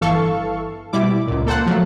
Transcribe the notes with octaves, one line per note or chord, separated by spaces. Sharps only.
G1 E3 A4 F5 C#6
B2 G3 E4 D6
C#2 A#2
A#3 A4 C5 F#5
F3 F#3 A3